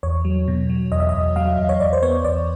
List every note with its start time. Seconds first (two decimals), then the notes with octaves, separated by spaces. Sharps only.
0.03 E2 C#5
0.25 F#3
0.48 B2
0.70 F#3
0.92 E2 D#5
1.00 E5
1.09 E2 D#5
1.36 F#3 F5
1.58 E2
1.69 C#5
1.80 E2 D5
1.93 C5
2.02 B3 C#5
2.24 E2 D5